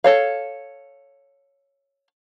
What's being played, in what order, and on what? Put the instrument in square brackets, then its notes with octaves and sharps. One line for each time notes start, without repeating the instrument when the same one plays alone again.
[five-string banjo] A4 C#5 F5